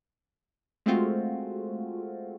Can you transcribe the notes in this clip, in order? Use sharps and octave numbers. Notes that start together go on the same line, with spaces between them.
G#3 A3 C4 F4 F#4